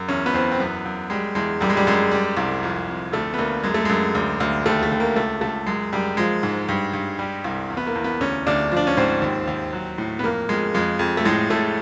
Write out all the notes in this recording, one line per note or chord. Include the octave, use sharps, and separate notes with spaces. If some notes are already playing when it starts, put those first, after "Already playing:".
Already playing: F#2
E2 C#4
B3
E2 C4
C4
F#2 B3
F#2
G3 G#3
E2 G#3
F#2 G3
G#3
G3
F#2 G#3
G3
C2
F2
F2
D2 A3
B3
D2 A#3
F#2 G#3
A3
F#2 G#3
D2
D2
D#2 A3
A3
D#2
A#3
C#2 A3
C#2 A3
F#2 G#3
F#2 G3
F3 G#3
G#2
G2
G2
G3
C2
E2
B3
A#3
E2
B3
D2 C#4
D2 D4
F3 D4
C#4
G#2 C4
D#2
D#2
F#3
A2
B3
F2 A#3
F2 G#3
F2 G#3
F2
A3
A2 G#3
A2 A3